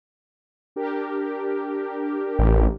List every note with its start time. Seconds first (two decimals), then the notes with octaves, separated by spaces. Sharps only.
0.76 D4 G4 A#4
2.39 A1